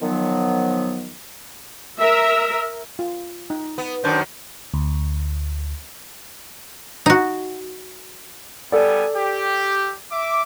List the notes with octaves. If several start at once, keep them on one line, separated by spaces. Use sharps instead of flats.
D#3 F3 F#3 B3
A#4 E5
F4
D#4
B3
F#2 D#3 D4 C5
D2
D#4 F#4
G3 B3 A4 D5 G#5
G4
E5 D6